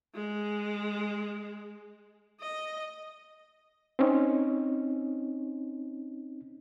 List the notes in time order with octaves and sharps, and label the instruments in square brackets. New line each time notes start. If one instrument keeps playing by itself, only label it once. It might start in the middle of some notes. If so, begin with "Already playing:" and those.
[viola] G#3
D#5
[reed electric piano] C4 C#4 D#4